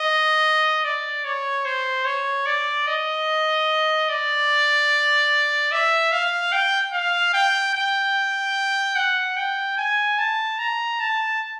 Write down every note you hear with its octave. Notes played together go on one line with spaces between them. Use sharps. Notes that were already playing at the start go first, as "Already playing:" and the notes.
Already playing: D#5
D5
C#5
C5
C#5
D5
D#5
D5
E5
F5
G5
F5
G5
G5
F#5
G5
G#5
A5
A#5
A5